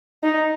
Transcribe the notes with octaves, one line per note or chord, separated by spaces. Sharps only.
D#4